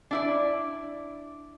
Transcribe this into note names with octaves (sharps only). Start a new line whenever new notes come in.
D4 E4 D5